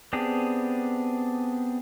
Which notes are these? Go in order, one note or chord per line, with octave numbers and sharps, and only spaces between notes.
B3 C4 D4 G4 G#4